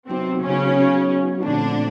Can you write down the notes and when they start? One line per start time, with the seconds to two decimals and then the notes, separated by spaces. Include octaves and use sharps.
0.09 C3 F#3 B3 C4 D#4 F#4
0.43 C#3 C#4
1.43 A#2 D3 F3 A3 C4 D4